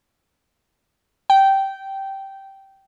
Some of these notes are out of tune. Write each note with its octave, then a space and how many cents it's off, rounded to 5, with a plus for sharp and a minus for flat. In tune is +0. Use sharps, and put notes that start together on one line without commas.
G5 -10